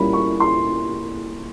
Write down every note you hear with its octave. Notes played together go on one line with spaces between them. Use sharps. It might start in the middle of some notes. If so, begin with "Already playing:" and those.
Already playing: A#2 G3 A#3 C#4 E4 B5
C#6
C6